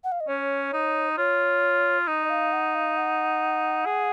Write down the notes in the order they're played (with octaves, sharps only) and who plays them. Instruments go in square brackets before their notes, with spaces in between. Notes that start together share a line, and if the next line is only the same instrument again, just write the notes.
[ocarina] F#5
F5
D#5
[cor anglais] C#4 [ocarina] C#5
[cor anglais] D#4
[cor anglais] F4 [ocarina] C#5
[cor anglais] D#4
[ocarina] D#5
F5
F#5
F5
F#5
[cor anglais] G#4